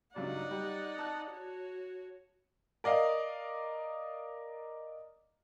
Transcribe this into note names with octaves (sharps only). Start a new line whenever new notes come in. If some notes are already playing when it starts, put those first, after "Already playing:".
C#2 G2 F#3 D#4 D5 F#5
G3
A5 F#6
F#4 C#5
A#4 D5 D#5 F5